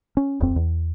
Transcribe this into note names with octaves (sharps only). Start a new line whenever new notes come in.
C#4
D#1 F2 C4
E2